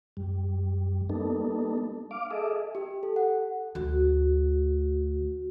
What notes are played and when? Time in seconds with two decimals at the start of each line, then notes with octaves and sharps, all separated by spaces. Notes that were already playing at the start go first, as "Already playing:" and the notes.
0.17 F#2 G3
1.10 G3 A#3 B3 D4 D#4 A4
2.11 F5 D6
2.31 G#4 A4 D#5 E5
2.75 G4
3.03 A4
3.16 F#5
3.75 D2 F#4